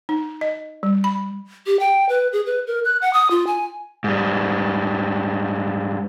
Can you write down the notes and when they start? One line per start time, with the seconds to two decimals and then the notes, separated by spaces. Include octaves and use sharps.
0.09 D#4
0.41 D#5
0.83 G3
1.04 B5
1.66 G4
1.80 G5
2.09 B4
2.33 G#4
2.46 B4
2.67 A#4
2.85 F#6
3.01 F#5
3.13 D#6
3.31 F4
3.47 G#5
4.04 G#2 G3